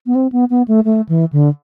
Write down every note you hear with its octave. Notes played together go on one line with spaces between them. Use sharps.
B3
C4
B3
B3
A3
A3
E3
D3